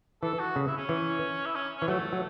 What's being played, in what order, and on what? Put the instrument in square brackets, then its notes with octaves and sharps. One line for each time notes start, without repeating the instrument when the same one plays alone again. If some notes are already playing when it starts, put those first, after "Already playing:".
[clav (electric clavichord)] E3 [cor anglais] A4
[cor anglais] F#4
[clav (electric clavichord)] C#3
[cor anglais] E4
C#4
[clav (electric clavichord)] E3
[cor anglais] E4
C#4
[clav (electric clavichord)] E3 [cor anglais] C#4
[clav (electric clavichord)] F#3 [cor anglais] A3
[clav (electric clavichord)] F#3